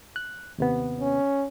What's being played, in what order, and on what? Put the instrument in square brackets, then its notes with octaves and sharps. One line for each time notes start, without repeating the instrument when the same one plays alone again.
[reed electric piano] F#6
D#2 C3 B3
[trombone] C#4